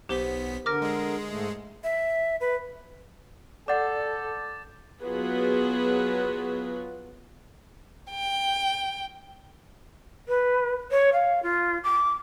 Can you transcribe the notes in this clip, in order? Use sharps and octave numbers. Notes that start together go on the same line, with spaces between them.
B1 B3 G4 C5 B6 G7
D3 A#4 D6 F6 A#6
G#3 G#4
G#2 A3
E5
B4
A4 D5 F#5 D6 G6 A6
F#3 B3 F4 F#4 G#4 B4
G5
B4
C#5
F5
F4
D6